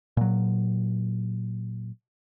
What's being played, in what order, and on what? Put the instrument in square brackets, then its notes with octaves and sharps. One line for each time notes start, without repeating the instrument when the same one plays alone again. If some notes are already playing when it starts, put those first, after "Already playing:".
[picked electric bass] A#2 F#3